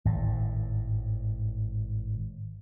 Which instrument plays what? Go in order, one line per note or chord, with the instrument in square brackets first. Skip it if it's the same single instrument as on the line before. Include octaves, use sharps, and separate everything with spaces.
[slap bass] G#1 A2